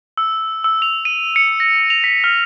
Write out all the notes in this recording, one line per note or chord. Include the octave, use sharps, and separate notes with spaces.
E6
E6
F7
D#7
C#7
A#6
F7
B6
F6